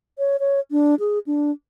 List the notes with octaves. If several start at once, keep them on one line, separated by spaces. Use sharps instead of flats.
C#5
C#5
D4
G#4
D4